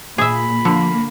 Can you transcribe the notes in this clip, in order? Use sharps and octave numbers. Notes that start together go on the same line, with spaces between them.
A#2 G#4 E5 B5
D3 F3 A#3